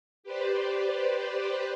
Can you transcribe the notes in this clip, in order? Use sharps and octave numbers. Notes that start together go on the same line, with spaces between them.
G4 B4 C5 D5